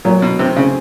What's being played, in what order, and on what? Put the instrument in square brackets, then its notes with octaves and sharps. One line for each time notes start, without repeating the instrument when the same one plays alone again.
[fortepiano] A#2 [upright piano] F#3
[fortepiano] B2
[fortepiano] C3 [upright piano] C4
[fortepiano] C#3